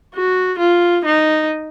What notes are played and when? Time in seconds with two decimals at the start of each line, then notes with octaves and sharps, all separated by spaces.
0.15 F#4
0.59 F4
1.05 D#4